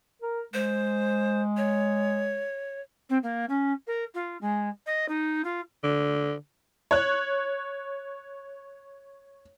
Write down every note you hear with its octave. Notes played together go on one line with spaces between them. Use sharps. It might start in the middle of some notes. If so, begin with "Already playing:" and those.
A#4
G#3 C5
C#5
C4
A#3
C#4
A#4
F4
G#3
D#5
D#4
F4
D3
C#5 F#6